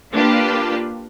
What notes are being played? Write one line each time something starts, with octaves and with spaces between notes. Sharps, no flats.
A#3 D4 F4 G4 B4